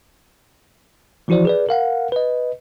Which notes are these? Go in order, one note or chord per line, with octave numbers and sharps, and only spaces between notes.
E3 F3 E4 F#4 C5 D5
G#4 B4 D5
A#4 F5 F#5
B4 D#5